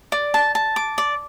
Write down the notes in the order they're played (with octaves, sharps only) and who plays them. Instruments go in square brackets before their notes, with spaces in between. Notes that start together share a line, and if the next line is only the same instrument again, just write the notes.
[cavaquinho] D5
A5
A5
D6
D5